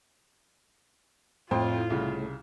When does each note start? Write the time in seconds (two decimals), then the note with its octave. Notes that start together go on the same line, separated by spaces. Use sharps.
1.51 F2 A2 F4 C5 G5
1.90 C2 C#3